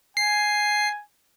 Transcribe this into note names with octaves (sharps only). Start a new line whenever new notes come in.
G#5 C7